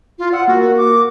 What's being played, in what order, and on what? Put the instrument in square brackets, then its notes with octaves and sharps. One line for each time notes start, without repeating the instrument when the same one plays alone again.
[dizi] F4
[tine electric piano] D5 E6 [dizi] F#5
[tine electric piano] A#3 A#4 [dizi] F#4
[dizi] D6